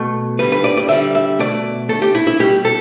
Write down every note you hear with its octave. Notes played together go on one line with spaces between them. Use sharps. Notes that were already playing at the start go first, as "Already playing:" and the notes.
Already playing: B2 A3
D3 G3 B4
B4
D5
D5
D3 G3 E5
E5
B2 A3 D5
D3 A3 A4
G4
E4
E4
B2 G3 G4
A4